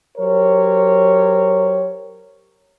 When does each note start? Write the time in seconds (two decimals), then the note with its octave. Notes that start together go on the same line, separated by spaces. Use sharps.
0.18 F#3 G4 A#4 C5 C#5